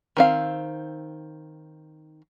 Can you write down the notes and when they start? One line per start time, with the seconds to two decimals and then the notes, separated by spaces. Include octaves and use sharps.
0.17 D#3 C4 F5